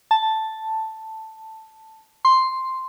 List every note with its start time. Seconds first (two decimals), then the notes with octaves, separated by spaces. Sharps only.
0.11 A5
2.25 C6